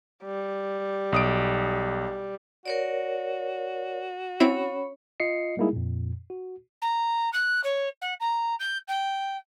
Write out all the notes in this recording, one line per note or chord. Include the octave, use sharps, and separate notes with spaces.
G3
B1 D#6 D7
F#4 A#4 C#5 D5
C4 C#4 E4 C#5 B5
F4 D#5 C7 C#7
G3 G#3 A#3 D#4 E4 G#4
F2 A#2
F#4
A#5
F#6
C#5
F#5
A#5
G6
G5